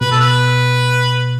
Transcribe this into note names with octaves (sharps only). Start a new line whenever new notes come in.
B2 B4
A4
B4